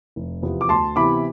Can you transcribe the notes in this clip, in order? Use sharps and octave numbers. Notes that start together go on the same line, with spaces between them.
F1
E2 C3 F3 B3
D6
D2 A5 C6
C3 E3 B3 B5 D6